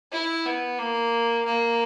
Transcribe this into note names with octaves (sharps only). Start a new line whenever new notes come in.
E4
B3
A#3
A#3